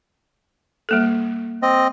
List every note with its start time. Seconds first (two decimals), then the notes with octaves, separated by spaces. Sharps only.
0.89 G3 A#3 A4
1.62 C4 D#5